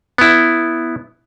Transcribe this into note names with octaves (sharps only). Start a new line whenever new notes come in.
B3 E4